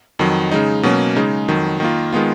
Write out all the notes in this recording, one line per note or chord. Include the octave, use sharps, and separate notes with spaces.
F2 D#3 F#3
C#3 G#3 D#4
B2 F#3 A#3 C#4
C#3 G#3 D#4
F2 D#3 F#3
D#3 A#3 F4
D#3 G#3 B3 F4